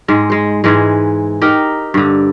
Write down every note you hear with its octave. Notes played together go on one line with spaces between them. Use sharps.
G#2 G#3
G#3 C5
G#2 E3 G#3
D#4 G4 A#4
G2 D3